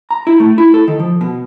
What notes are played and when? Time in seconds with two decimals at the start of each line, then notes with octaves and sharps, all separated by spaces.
0.11 A#5
0.27 E4
0.40 A3
0.58 E4
0.74 A4
0.88 D#3
1.00 F3
1.21 B2